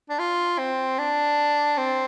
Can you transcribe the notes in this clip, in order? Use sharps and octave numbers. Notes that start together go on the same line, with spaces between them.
D4
F4
C4
D4
C4